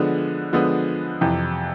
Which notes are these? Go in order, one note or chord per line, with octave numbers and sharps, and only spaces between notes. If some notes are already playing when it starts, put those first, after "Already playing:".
Already playing: D3 F3 G#3 B3
D3 F3 G#3 B3
F2 C3 E3